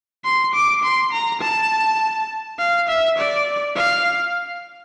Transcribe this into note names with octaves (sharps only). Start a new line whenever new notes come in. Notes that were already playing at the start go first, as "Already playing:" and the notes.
C6
D6
C6
A#5
A5
F5
E5
D5
F5